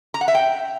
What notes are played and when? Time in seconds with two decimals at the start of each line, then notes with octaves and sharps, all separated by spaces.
0.14 A#5
0.21 F#5
0.28 E5
0.35 G5